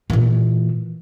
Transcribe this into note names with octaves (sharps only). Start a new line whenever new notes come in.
A#2 E3